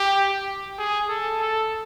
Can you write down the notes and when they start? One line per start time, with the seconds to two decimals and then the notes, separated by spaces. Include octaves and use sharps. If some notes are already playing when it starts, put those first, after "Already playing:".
Already playing: G4
0.79 G#4
1.09 A4
1.40 A4